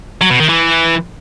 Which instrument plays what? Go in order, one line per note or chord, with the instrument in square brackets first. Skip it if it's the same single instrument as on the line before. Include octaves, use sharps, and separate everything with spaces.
[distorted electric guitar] F#3
B2
D#3
E3